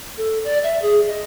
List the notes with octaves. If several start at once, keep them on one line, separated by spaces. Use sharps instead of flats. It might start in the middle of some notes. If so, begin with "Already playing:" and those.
A4
D5
E5
G#4
D#5